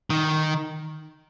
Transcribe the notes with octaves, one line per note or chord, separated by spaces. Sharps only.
D#3